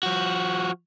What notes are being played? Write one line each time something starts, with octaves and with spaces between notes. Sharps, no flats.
F3 F#4